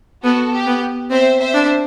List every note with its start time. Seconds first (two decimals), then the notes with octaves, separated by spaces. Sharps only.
0.23 B3 F#4 A4
0.52 G4
0.67 B3
1.10 C4 C5 E5
1.39 C5 E5
1.54 D4